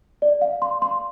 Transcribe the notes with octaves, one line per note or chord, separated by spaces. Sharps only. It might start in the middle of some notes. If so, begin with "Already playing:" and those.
D5
F5
C6
C6